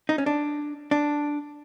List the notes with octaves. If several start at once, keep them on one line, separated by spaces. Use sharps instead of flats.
D#4
C#4
D4
D4